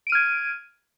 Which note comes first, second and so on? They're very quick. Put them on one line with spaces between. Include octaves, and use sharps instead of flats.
D7 D#7 F6 G#6